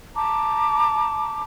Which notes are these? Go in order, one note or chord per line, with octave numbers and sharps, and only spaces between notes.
A5 A#5 D6